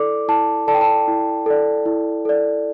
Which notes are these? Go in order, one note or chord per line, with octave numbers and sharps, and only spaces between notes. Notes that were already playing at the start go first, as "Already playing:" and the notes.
Already playing: E4 A4 D5 D6
E4 A5
A4 D5 A5
G5
A5
E4
A4 D5
E4
A4 D5